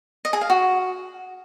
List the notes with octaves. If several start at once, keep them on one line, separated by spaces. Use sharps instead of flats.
D#5
G#4
F5
F#4